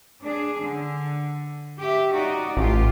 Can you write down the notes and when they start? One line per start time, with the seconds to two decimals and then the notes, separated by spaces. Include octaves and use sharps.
0.23 D4 G#4
0.63 D3
1.80 G4 E5
2.13 D#4 F#4 D5
2.57 A1 F4 G4